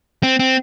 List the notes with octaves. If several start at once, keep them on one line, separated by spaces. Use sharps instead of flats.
C4
C4